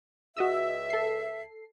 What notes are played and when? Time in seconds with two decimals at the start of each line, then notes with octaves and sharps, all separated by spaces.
0.37 C#2 F#4 D#5 E5 E6
0.90 A4 C7